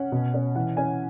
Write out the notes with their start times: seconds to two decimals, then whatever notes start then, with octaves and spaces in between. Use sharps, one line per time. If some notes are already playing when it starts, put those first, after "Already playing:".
Already playing: C#4 F#5
0.12 B2
0.34 C#4
0.56 E3 F#5
0.77 C#4 G#5